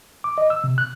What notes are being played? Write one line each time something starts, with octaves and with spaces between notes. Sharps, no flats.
D6
D#5
E6
C3
F#6